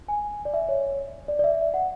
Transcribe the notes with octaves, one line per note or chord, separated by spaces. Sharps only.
G#5
D5
E5
C#5
D5
D5
E5
F#5